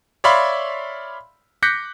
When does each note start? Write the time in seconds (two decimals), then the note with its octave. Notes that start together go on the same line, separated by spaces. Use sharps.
0.24 C#5 D5 E5 F5 B5 C6
1.62 D6 F#6 G6 A#6 B6 C#7